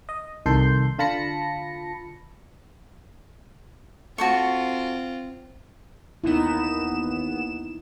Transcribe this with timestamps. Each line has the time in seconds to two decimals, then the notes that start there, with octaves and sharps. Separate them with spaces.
0.09 D#5
0.46 C2 D#3 A4 C6 G6
0.99 D3 F4 A5 B5 A#6 C#7
4.18 C4 F4 F#4 A4 C#6
6.24 D#2 B3 D#4 E4 E7